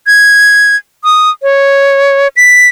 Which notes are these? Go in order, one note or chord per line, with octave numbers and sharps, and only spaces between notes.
G#6
D#6
C#5
B6